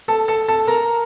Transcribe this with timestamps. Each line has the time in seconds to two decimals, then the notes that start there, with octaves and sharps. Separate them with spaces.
0.08 A4 A5
0.28 A4 A5
0.48 A4 A5
0.67 A#4 A#5